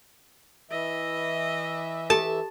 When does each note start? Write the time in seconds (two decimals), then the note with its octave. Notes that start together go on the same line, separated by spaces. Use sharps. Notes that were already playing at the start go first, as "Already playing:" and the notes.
0.71 E3 D#5 E5
2.10 G4 A4 A5